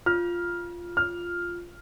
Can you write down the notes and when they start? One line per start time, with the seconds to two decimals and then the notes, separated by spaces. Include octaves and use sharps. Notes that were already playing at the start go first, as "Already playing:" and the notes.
0.06 F4 F6
0.97 F6